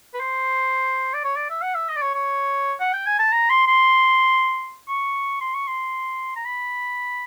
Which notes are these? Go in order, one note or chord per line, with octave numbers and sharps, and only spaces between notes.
B4
C5
D5
C#5
D5
E5
F#5
E5
D#5
D5
C#5
C#5
F#5
G5
G#5
A5
A#5
C6
C6
C#6
C6
C#6
C6
A#5
B5